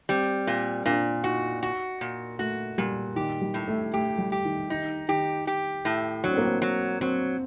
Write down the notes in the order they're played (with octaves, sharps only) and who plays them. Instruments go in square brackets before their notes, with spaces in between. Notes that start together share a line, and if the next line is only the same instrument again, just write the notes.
[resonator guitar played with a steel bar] G3 [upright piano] C4
[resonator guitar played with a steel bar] A#2
[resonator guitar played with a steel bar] A#2 [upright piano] D4
[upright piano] D#4 [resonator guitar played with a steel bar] F#4
[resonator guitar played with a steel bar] F#4
A#2
[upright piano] A3 [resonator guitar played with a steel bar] F#4
[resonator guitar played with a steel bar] A#2 [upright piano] G3
[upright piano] D#3 [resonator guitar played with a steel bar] G4
[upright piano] G3
[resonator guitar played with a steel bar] A2
[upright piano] A3
[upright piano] A3 [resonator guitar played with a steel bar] G4
[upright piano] G3
[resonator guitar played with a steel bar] G4
[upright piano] D#3
[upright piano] D#3 [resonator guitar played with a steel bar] D#4
[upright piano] D#3 [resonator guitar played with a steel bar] G4
[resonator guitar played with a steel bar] G4
A2
[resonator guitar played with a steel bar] F#3 [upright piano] D4
[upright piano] C4
A#3
C4
[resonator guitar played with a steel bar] F#3
[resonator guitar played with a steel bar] F#3 [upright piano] C4